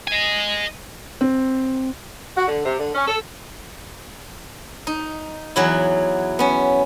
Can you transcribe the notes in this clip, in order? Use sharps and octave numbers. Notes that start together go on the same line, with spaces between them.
D#5 G#5
C4
F#4
D3
C3
D3
C#4
A4
D#4
E2 F#3 E4
B3 C#4